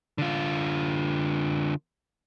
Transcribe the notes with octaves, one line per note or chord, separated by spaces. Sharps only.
D3 F4